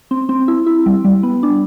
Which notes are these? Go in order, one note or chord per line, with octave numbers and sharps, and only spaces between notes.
C4
C4
E4
E4
G3
G3
B3
D4